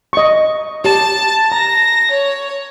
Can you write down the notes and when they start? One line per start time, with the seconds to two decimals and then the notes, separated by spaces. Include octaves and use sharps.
0.13 D#5 C#6
0.85 G4 A5
1.52 A#5 A#6
2.11 C#5